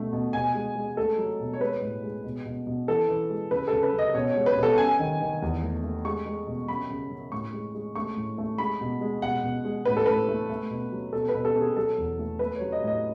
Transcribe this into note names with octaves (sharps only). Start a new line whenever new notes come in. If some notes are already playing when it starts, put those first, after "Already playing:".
Already playing: B2 A3
B2
B2 G#5
G#3
G#3
A3 A4
F#3
B2
C#5
G#3 B4
A2
G#3
B2
B2
B2
E3 A4
E3
G#3
C#3 B4
C#3 A4
B4
F#2
D#5
B2 C#5
C#5
G#3
B4
B2
A4
F#2 G#5
D#3
D#3
E2
A3
A3
G#3 C#6
G#3
B2
F#2 B5
C#3
F#2
A2 C#6
G#3
G#3
A3 C#6
A2
A3
G#3 B5
B2
G#3
B2 F#5
B2
G#3
A2 B4
A4
A2 B4
A3
A3
B2
F#3
B2 A4
B4
B2
A4
B2
G#4
F#3 A4
E2
A3
A3 B4
C#5
F#3
D#5
A2 D#5